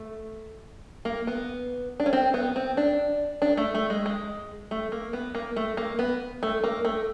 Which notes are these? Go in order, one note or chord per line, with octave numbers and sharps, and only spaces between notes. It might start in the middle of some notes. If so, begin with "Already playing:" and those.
Already playing: A3
A#3
B3
D4
C#4
C4
B3
C4
D4
D4
A3
A3
G#3
G#3
A3
A#3
B3
A#3
A3
A#3
B3
A3
A#3
A3